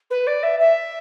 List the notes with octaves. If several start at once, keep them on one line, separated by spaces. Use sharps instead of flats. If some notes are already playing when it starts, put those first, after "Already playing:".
B4
D5
E5
E5